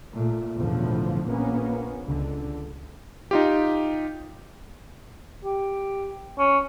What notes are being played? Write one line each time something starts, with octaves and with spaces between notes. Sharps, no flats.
A#2 A3
B1 E2 A2 D3 F3
A#1 A#3 B3 C#4
C#2 D3
D#4 F4 G4
G4
C#4